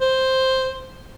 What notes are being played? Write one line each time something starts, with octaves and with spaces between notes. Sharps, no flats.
C5